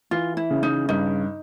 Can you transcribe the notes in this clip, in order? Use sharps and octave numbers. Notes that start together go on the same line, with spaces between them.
E3 F4
E4
C#3
D#4
G2 D#4